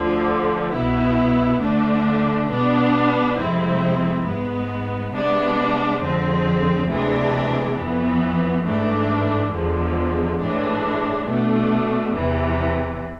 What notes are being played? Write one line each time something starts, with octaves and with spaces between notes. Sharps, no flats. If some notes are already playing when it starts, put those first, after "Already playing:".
Already playing: D2 D3 F3
C2 B2 B3 E4
D2 D3 A3 D4
B2 G#3 B3 D4
F2 C3 G#3 C4 E4
G#2 G#3 B3
C3 G#3 B3 D4
F2 D3 G#3 C4
D2 C3 E3 G#3 D4
F2 E3 B3
G#2 E3 A3 D4
E2 D3 F3 G#3
A2 E3 G#3 D4
B2 A3 D4
E2 C3 E3